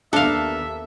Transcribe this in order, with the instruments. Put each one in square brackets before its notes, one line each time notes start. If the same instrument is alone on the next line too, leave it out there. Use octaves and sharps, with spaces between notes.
[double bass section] D#2 A#3 B3 [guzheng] D4 F5 [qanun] A4 [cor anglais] E5